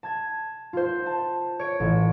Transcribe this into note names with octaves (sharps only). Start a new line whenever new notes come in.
A5 G#6 A6
F4 C5
A5
C#5 D7
A1